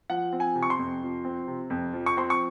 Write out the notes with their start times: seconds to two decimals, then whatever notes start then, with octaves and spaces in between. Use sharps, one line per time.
0.10 F3 F#5
0.33 C4
0.40 G#5
0.55 C3
0.63 C#6
0.70 C6
0.79 F2
1.02 F3
1.25 C4
1.48 C3
1.70 F2
1.93 F3
2.06 C#6
2.17 C4 C6
2.30 C#6